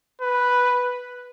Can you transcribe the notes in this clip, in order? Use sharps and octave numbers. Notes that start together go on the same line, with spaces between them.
B4